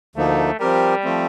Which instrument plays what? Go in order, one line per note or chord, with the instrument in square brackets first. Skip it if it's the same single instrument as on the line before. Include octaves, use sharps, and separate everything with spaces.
[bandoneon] D2 D3 F3 A#3 D#4 [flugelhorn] A3
[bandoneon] F3 C4 G4 A#4 [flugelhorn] G3
[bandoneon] F3 A3 C4